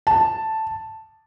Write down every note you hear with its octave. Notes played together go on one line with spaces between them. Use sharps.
A5